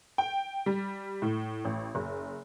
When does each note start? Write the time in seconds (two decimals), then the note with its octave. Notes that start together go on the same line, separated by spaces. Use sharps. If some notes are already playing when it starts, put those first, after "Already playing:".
0.18 G5
0.66 G3
1.22 A2
1.65 A1
1.95 F#1